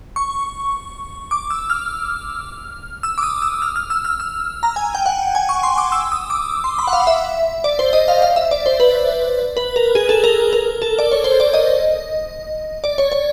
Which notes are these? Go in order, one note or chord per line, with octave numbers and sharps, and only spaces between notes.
C#6
D6
E6
F6
E6
D6
D#6
E6
F6
F6
E6
F6
E6
A#5
G#5
G5
F#5
G#5
C#6
C6
D6
E6
D#6
D6
C6
B5
F#5
F5
E5
D5
C5
D#5
F5
F5
E5
D5
C5
B4
B4
A#4
G#4
A4
A#4
A#4
A4
D5
C#5
C5
D5
D#5
D5
C#5
C#5